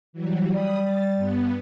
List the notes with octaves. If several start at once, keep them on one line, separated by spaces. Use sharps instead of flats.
E3 F#3 G3
G3 B5 D#6
A6
G2 B3